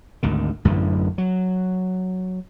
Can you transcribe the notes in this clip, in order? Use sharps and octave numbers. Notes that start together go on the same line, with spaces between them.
G#1 D2 D#3
A1 F#2 D3 E3
F#3